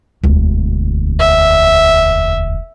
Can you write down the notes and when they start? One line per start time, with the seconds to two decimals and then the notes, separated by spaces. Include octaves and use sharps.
0.24 E1 D2
1.19 E5